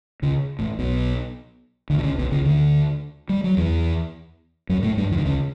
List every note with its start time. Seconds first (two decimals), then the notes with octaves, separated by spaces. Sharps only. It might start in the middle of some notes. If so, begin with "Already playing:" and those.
0.22 C#2 C#3
0.59 A1 A2
0.78 B1 B2
1.90 D2 D3
1.98 B2
2.03 C#2 C#3
2.18 B1 B2
2.32 C#2 C#3
2.45 D2 D3
3.29 G3
3.44 F#3
3.57 E2 E3
4.69 F#2 F#3
4.82 A2 A3
4.97 G2 G3
5.11 E2 E3
5.18 D3
5.25 C#2 C#3